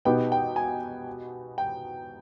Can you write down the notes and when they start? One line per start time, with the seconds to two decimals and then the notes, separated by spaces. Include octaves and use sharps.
0.05 B2 B3 D#4 G4 G5
0.32 G5
0.56 G#5
1.58 G5